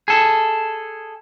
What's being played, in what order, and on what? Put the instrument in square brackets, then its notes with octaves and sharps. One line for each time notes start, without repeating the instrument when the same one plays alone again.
[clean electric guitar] G#4 A4